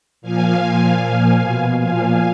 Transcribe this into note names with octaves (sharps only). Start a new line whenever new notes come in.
A#2 F3 F5 G#5
A#2 F3
A#2 F3
B2
A#2 F3 F5 G#5